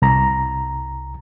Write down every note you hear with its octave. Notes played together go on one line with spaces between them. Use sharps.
C2 A#5